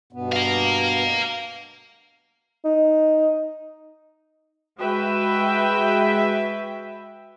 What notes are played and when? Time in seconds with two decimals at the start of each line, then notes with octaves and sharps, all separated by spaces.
0.13 G2 B2 B3
0.33 F5 A#5
2.65 D#4
4.79 G#3 F#4 B4 E5 G5